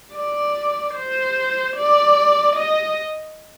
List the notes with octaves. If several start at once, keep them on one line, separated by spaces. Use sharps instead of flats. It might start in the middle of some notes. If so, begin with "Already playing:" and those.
D5
C5
D5
D#5